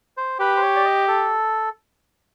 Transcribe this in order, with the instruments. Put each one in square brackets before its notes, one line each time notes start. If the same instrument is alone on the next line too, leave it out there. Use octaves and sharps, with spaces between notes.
[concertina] C5
[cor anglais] G4 [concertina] B4
[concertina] C5
C#5
D5
D#5
A4